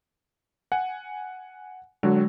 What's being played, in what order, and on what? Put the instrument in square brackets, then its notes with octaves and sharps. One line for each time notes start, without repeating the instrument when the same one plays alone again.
[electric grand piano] F#5 G#5
[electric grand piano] D3 F#3 F#4 [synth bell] G#3